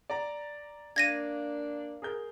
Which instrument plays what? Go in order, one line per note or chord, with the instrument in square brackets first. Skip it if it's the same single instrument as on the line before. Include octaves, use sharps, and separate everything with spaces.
[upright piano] D5 A#5
[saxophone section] A#3 D4 [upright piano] F5 [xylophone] G#6 A#6 D#7
[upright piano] G#4 A#4 G6